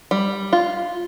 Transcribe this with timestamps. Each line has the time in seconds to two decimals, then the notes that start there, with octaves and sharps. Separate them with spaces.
0.11 G3
0.53 F4